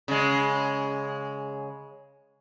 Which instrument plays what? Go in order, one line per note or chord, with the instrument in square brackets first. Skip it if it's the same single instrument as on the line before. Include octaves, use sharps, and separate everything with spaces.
[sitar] C#3 G#3